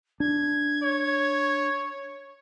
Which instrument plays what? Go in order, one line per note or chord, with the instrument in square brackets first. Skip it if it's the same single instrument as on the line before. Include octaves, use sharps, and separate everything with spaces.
[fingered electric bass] D4 [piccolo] G#6
[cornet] C#5